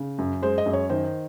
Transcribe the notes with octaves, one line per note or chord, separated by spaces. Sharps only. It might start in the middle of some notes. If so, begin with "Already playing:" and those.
Already playing: C#3
F#2
G#3 C5
D#5
F#2
C#5
D#3 C5